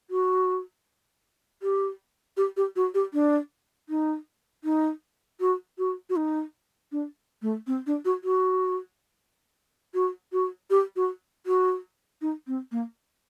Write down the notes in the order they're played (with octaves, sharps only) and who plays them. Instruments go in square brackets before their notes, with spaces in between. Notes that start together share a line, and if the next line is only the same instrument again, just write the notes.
[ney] F#4
G4
G4
G4
F#4
G4
D4
D#4
D#4
F#4
F#4
F#4
D#4
D4
A3
C4
D4
F#4
F#4
F#4
F#4
G4
F#4
F#4
D#4
C4
A#3